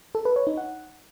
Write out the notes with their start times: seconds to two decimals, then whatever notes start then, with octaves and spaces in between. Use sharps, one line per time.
0.15 A4
0.25 B4
0.36 C#5
0.47 D#4
0.57 F#5